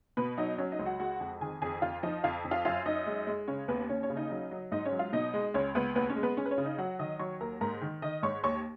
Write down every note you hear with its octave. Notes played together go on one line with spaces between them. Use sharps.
B2 B4 B5
F#3 D#4 D#5
F#3 C#4 C#5
D#4 D#5
C#2
F#4 F#5
G#3 F#4 F#5
F2
D#3 G#4 G#5
F2 G#4 G#5
F2 F4 F5
F3 D#4 D#5
F2 F4 F5
F2
F4 F5
F#2 F4 F5
F#2 D#4 D#5
G#3
G#3
C#3 C#4 C#5
D#2 B3 B4
D#2 C#4 C#5
C#4 C#5
C#3
D#4 D#5
F#3 D#4 D#5
F#3
G#2 D#4 D#5
C#4 C#5
F#3
F4 F5
B2 D#4 D#5
G#3
C#2 C#4 C#5
C#2 B3 B4
D#2 B3 B4
C#4 C#5
G#3
B3 B4
G#3 C#4 C#5
B4
C#4 C#5
C#3
D#4 D#5
F#3 F#4 F#5
D#3 D#5 D#6
F#3 C#5 C#6
D#2 A#4 A#5
G#2 A#4 A#5
D#3
D#3 D#5 D#6
G#2 C#5 C#6
D#2 C#5 C#6